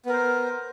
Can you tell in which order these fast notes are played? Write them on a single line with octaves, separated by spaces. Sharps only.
B3 A#4 C5